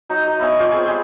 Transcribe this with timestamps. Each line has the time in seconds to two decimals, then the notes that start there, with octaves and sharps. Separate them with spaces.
0.09 F#3 D#4
0.27 D#5
0.39 B3 E4 C#5 G#5
0.59 F4 C#5 D5 G5
0.72 C4 G#4 G#5
0.86 G3 G#3 G5